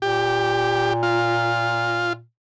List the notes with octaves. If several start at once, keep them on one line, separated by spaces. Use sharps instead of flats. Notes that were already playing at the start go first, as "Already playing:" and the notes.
A#2 G4
F4